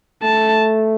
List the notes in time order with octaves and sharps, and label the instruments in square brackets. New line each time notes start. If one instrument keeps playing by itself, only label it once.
[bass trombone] A3 [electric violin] A5